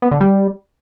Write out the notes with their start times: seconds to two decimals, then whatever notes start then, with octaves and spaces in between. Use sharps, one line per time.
0.02 B3
0.11 D3
0.20 G3